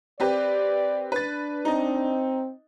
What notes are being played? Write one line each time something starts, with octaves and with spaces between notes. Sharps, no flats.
C4 G4 B4 D5
D4 B4 A6
C4 D#4 D#5